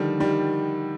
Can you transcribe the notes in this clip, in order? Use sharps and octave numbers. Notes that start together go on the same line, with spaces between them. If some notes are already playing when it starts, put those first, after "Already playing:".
Already playing: D3 D#3 F3 G3
D#3 G3